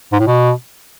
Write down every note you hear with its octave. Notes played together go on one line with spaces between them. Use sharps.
G#2
A2
B2